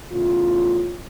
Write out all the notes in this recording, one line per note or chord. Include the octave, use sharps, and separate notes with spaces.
E2 A2 C#3 F4